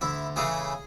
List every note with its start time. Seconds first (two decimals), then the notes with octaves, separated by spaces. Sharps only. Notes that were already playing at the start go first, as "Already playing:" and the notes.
0.01 D2 E4
0.36 C#3 E3 A3 G#4